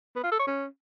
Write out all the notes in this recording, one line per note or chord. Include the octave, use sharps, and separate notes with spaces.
B3
F4
A4
C#5
C#4